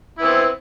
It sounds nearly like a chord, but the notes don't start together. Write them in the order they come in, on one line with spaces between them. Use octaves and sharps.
E4 B3 C4